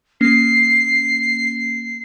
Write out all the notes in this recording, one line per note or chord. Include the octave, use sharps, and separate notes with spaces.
A#3 C#4 C7